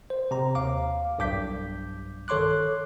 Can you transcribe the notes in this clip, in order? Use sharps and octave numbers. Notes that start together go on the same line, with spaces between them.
C5
C3 A#5
D#2 F5 D6
B1 G2 D6 G6 B6
D#3 A4 C#5 C6 D6 F#6